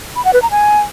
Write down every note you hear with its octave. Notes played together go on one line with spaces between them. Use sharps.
B5
F#5
B4
A#5
G#5